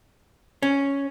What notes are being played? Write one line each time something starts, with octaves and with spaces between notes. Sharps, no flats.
C#4